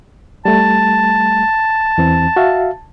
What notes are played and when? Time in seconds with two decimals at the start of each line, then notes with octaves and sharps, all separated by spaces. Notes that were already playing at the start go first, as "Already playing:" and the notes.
0.45 G3 A3 A5
1.98 E2 E3 C4
2.36 F#4 E5 F5